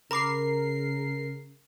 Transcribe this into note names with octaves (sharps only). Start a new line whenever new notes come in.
C#3 A#4 A#5 B5 D6 C7